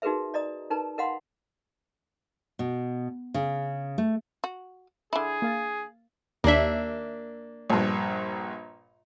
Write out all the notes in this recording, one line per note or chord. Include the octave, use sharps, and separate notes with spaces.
D#4 F#4 G#4 A#4 B4 E5
D5 D#5 A#5 D#6
D#4 A#4 B4 A5 A#5
A#4 D#5 F5 F#5 B5 C6
B2
C#3
A3
F#4
D3 E4 G#4
A#3 F5 A6
D#2 A#3 D4 E5
A#1 G2